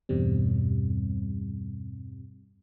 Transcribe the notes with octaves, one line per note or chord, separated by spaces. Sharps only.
E2 G2 B2 G3 C4